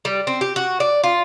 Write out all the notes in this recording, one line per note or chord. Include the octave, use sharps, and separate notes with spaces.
G3
C4
G4
F#4
D5
F4